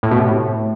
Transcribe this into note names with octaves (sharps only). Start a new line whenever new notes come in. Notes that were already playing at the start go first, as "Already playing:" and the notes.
A2
B2
C3
A2